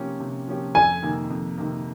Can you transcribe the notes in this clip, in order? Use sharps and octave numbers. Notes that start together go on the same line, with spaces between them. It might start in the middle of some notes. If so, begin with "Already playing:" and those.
Already playing: C3 F3 A#3 C#4 G4
C3
F3 A#3 C#4 G4
F2 G#5
C3 D#3 A#3
F2
C3 D#3 A#3